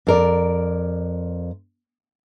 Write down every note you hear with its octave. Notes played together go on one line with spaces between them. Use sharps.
F2 A#4 D5